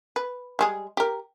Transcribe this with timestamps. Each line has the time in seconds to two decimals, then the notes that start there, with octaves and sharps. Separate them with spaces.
0.16 B4
0.59 G3 G#3 G#4
0.97 G4 A#4